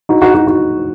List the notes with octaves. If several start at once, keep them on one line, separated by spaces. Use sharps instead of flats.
D#4 F#4
D#4 F#4
D#4 F#4
D#4 F#4